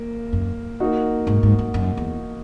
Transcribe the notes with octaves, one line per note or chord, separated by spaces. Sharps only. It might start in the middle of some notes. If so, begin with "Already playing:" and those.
Already playing: A#3
F#2
A#3 D#4 F#4
G#2
G#2
F#2
F#2
E2